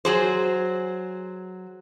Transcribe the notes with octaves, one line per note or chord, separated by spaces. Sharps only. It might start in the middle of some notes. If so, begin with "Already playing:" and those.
F#3 G#4 C5